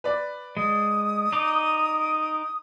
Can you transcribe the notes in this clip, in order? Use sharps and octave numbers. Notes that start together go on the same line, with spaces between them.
B4 D5
G#3 D#6
D#4 D6